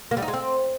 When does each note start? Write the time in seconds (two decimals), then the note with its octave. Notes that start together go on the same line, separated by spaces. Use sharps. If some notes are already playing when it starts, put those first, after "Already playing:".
0.11 A#3
0.17 G3
0.22 D#4
0.28 G#3
0.34 C4